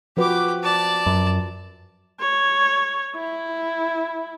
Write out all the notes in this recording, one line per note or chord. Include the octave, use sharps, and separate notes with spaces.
F3 F#4 G4 B4 D6
D5 A5
F#2
C#5
E4